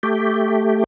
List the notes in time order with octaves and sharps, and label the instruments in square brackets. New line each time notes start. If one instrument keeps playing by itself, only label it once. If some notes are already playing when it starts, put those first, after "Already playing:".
[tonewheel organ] A3 G4